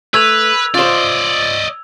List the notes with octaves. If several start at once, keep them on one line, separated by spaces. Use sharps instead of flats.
A3 B4 E6 G#6 F7
F4 C5 D5 D#5